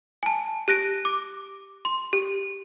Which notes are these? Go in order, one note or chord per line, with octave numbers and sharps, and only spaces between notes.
G#5 A5
G4 F#6 A#6 D7
D6
C6
G4